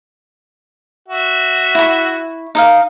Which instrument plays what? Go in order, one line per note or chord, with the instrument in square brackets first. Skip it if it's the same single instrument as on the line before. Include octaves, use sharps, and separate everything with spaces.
[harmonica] F#4 E5
[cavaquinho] E4 C#6
D#4 D#5 F5